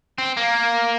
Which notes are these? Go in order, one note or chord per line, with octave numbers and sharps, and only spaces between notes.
C4
A#3